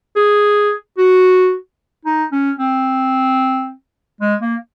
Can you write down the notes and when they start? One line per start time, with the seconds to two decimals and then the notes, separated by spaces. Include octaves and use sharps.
0.16 G#4
0.97 F#4
2.05 D#4
2.32 C#4
2.59 C4
4.21 G#3
4.42 A#3